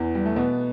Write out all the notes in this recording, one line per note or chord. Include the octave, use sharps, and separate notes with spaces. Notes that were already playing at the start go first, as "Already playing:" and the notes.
Already playing: E2 E3
G3
A3
B2 B3